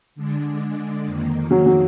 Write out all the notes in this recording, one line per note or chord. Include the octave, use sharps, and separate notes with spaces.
D3 G#3 D4
F2 D#3 A#3
F#3
F#3